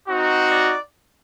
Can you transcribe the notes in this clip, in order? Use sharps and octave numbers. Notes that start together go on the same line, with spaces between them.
C4 D#4 F#4
D5